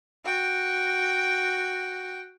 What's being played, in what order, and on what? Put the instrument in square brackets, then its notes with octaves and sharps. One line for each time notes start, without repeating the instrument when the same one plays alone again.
[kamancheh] F#4 G5